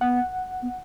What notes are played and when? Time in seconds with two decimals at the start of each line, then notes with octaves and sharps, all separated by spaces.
0.01 B3 F#5
0.62 B3